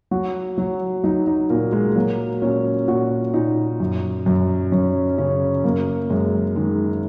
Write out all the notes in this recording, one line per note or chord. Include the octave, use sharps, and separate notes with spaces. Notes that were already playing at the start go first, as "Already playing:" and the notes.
F#3 F#4
F#3
F#3 D#4
D#4
A#2 A#3
G#3
F#3 A#3
A#2 C#4
A#2 F#4
A#2 D#4
F#2
F#2
F#2 C#4
C#3 C#4
F#2 A#3
F#2 G#3
D#3 G#3